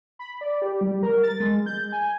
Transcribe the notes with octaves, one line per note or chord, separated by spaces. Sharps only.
B5
D5
G4
G3
A#4
A6
G#3
G6
G#5